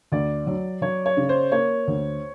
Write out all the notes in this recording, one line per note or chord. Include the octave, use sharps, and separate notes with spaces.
D2 D5
F#3
F#3 C#5
C#5
C#3
C5
A#3 C#5
D2